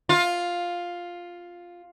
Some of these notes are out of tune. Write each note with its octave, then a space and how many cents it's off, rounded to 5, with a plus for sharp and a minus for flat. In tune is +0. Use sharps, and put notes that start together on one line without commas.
F4 +5